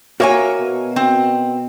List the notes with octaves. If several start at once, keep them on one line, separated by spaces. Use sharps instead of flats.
A#3 F#4 A#4 C#5 E5 G#5
B2
C4